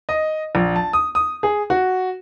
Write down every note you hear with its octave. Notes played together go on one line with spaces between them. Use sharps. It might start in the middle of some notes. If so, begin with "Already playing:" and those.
D#5
A#1
A5
D#6
D#6
G#4
F#4